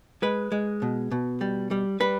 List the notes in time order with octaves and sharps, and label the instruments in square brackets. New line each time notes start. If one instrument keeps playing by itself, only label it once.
[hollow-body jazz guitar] G#3 B4
G#3
B2
B2
G3
G3
G3 B4